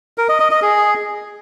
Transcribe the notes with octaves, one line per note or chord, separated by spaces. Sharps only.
A#4
D#5
D#5
D#5
G#4